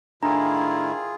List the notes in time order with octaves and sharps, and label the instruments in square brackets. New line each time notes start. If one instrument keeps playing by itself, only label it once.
[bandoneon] A2 D#3 E4 [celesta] D4 G#5 [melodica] F4 G#4 [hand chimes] A#5